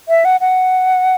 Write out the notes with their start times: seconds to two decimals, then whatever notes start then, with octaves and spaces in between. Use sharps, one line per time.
0.09 E5
0.25 F#5
0.41 F#5